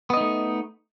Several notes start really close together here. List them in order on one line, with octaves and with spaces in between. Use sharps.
B3 D#5 D#4 A3